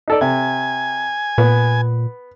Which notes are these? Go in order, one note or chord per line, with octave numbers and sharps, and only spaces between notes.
D#4 A4 D5
C3 G#5
A#2 B3